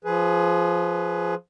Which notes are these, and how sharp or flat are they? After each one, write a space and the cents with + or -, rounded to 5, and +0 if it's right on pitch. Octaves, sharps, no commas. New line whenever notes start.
F3 +0 G#4 +20 B4 +0